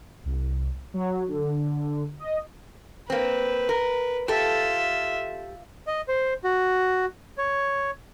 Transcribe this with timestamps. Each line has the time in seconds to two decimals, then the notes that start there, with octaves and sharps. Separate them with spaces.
0.25 C2
0.94 F#3
1.28 D3
2.19 D#5
3.10 A#3 C4 B4
3.69 A#4
4.28 F4 G4 A4 E5
5.87 D#5
6.08 C5
6.44 F#4
7.38 C#5